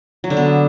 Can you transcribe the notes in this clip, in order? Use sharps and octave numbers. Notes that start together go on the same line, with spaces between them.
F#3
D3
B3